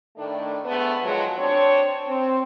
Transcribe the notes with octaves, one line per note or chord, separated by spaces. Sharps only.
A2 D#3 A3 D4
G#2 A3 B3
D#3 F3 F#3 G#3
C4 D4 C#5
C4